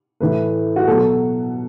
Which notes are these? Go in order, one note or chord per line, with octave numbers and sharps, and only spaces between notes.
A2 E3 B4
F#4
B2 F#3 A4